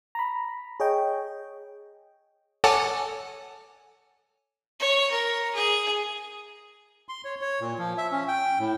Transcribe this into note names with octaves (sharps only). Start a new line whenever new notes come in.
A#5 B5
G#4 C#5 D#5 G5
A4 C#5 F#5 G#5 A5 D6
C#5
A#4
G#4
C6
C#5
C#5
A#2
F3
E5
C#4
G5
A2